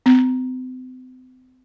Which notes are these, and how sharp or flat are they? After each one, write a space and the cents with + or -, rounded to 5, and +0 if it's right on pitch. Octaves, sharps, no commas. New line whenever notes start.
C4 -40